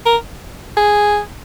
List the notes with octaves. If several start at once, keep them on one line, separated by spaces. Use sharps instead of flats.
A#4
G#4